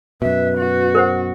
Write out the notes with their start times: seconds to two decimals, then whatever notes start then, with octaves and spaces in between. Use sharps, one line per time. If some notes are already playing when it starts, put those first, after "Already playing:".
0.22 F#2 B2 B4 E5
0.58 F#4
0.95 A#4 C5 F#5